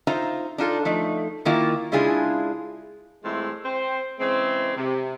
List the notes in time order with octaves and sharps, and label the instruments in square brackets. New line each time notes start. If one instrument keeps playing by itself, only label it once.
[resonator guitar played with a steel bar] D#4 F4 C5 E5 A#5
D4 D#4 F4 A4
F3 A3 D#4
D#3 A#3 E4 F4
C#3 G#3 D4 E4 F4 G#4
[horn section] A2 E3 G#3 C4 E4 F4
C4 C5
C#3 E3 G#3 C4
C3